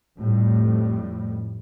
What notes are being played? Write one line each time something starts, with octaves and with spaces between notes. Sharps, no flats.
F2 A2 G3